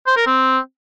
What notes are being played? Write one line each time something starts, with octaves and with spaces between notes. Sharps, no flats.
C5
A#4
C4